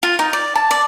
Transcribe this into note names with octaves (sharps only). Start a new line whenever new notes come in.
F4
D#4
D5
A5
D5